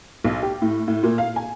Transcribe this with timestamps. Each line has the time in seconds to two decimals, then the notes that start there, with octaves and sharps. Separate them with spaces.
0.24 B1
0.43 G4
0.62 A2
0.88 A2
1.03 A#2
1.18 F5
1.36 G#5